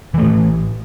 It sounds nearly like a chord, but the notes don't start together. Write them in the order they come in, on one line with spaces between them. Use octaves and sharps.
E3 A3 A2